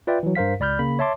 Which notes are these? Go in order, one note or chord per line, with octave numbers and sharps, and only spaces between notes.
F4 B4 D5 E5 G5
E3 F#3
G2 A#4 C5 F5 B6
C#2 D5 B5 F6 G6
C#3 A#3 B5
C#5 E5 A5 C6 D6